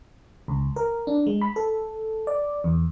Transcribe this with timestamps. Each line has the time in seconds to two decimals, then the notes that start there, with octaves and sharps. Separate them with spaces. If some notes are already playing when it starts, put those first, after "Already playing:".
0.48 C#2
0.76 A#4
1.07 D4
1.27 G#3
1.41 B5
1.56 A4
2.27 D5
2.64 E2